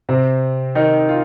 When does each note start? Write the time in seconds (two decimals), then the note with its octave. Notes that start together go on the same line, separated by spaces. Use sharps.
0.09 C3 C4
0.75 D#3 D#4
1.09 F4